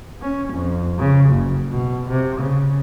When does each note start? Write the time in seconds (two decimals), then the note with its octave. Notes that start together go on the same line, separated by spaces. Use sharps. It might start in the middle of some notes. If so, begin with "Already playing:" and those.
0.22 C#4
0.53 F2
0.99 C#3
1.30 F#1
1.69 B2
2.09 C3
2.40 C#3